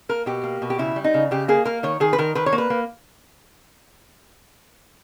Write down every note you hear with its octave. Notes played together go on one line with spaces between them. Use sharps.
A#3 A#4
B2 G4
A#3
B2
G4
C#3 E4
G3
D#4
C#3
C#3 G4
A#3 G#4
A#3 A#4
D#3 C#5
D#3 G#4
B4
D#3 A#4
D#3 B4
C#5
A#3
B4
A#3